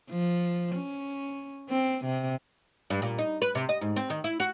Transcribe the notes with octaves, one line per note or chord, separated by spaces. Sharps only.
F3
C#4
C4
C3
G2
A#2
D#4
B4
C3
D#5
G#2
C4
D#3
E4
F#4